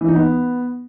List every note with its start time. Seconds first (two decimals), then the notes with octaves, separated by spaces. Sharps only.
0.01 E3
0.08 D#4
0.15 B3